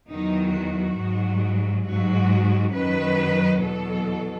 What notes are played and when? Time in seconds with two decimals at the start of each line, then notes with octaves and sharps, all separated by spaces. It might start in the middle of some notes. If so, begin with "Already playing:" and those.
0.10 E2 D#3 F#3 D#4
0.55 F#4
0.98 G#2 F#3
1.86 G#2 F#3 F#4
2.74 F#2 D#3 F#3 B4
3.63 E2 B2 F#3 A4